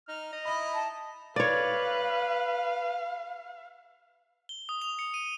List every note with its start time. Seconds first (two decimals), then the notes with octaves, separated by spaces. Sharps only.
0.09 D#4 F6
0.33 D#5
0.45 D#4 E4 B5
0.74 A5
1.36 B4 C#5 D5 F5
4.49 G7
4.69 D#6
4.82 F7
4.99 C#7
5.14 D#7